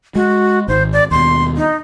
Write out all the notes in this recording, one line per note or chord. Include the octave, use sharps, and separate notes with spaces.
G#3 F#4
G#1 C5
D5
D#2 B2 C6
D#4